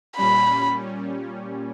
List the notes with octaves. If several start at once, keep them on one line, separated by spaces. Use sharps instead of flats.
A#2 G3 C#4 B5